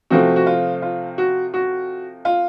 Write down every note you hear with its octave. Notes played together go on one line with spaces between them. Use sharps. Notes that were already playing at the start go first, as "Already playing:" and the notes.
C3 F3 A3 C4 F#4
F#4
F4
F4
F#4
F#4
F4